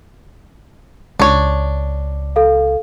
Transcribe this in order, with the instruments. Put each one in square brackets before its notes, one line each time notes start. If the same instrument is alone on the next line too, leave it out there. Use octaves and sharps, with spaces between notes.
[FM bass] C#2 [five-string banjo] D4 C#5
[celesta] A4 F5